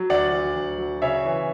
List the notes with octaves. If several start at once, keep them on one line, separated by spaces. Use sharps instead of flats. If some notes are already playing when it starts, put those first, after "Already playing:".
Already playing: F#3
D2 D5 F#5
F#3
D2
F#3
C#3 C#5 E5
E3